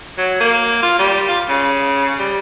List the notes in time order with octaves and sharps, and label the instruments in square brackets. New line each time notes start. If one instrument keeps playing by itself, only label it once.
[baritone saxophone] F#3
A#3
F4
G3
F4
C#3
G3